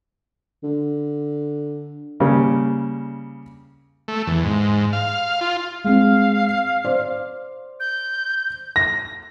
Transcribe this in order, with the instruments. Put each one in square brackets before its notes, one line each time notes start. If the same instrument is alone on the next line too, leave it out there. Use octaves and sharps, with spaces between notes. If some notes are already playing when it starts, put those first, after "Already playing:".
[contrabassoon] D3
[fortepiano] C#3 G3 A#3
[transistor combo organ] A3
E2
G#2
F5
F4
[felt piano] G#3 C4 [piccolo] F5
[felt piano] C5 D5
[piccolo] G6
[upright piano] A#6